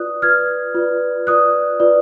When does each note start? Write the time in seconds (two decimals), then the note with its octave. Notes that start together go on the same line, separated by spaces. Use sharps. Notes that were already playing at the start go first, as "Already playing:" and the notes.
Already playing: F4 B4 D5 D#6 F#6
0.22 F4 B4 D5 F6 G#6
0.75 F4 B4 D5
1.27 F4 B4 D5 D#6 F#6
1.80 F4 B4 D5